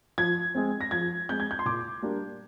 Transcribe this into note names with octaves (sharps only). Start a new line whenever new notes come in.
F3 G#6
G#3 C4
A#6
F3 G#6
G#3 C4 G6
G#6
G6
C6
A#2 D6
G3 A#3 D4